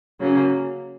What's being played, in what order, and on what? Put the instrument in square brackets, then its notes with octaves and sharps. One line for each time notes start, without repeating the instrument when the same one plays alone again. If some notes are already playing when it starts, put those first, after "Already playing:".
[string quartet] C#3 F#3 A#3 C#4